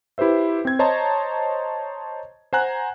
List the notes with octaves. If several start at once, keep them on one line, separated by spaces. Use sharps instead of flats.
E4 G4 B4 C5 E5
C4 G#6
C5 C#5 D#5 A5 A#5 C6
C5 F#5 G#5 A#5 F#6